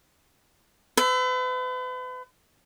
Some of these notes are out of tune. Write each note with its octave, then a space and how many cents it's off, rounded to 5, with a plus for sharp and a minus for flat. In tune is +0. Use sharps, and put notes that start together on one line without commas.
B4 +40 E5 +0